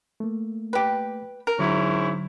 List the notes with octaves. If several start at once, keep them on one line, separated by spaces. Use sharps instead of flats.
A3 A#3
G4 B4
A#4
G#2 D3 F#3 C#4 E4